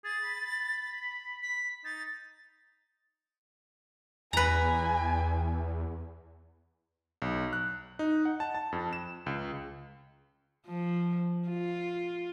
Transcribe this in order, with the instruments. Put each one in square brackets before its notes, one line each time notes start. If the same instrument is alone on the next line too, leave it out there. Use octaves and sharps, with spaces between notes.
[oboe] G#4 [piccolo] A6
[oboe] B5
[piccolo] B6
[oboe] D#4 [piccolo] A6
[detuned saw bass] E2 [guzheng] B4 A#5 [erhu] G#5
[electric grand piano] B1
F#6
D#4
F#5
A5
A5
F2
E7
C#2
[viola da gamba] F3
F4